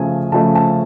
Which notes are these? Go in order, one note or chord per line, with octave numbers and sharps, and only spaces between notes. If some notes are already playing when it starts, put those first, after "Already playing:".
Already playing: C#3 F3 A3 G#5
C#3 F3 A3 A5
A5